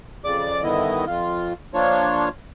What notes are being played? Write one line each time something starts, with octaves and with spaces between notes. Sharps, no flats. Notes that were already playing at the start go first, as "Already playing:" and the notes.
F2 C#3 D5 D6
G2 D3 D#3 B3 E4 D#5
F2 F4
F3 A#3 D4 F4 C#5